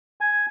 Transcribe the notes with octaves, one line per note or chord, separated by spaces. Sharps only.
G#5